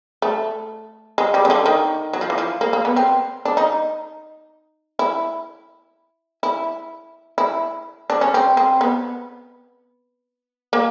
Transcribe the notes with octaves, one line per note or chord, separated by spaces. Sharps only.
A3
G#3
G3
C#3
D3
D#3
F#3
F3
E3
F3
A#3
A#3
B3
C4
D4
D#4
E4
E4
E4
D4
C#4
C4
C4
B3
A#3